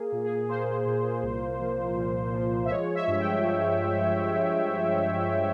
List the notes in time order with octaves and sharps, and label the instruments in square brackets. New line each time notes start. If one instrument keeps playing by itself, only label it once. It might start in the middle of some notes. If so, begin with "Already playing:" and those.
Already playing: [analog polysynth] A#3 G#4
A#2
G#4
A#3 C5
A#2
C2
F3
A#2
F3
E5
G#3 C#5
E5
G2
G5
F3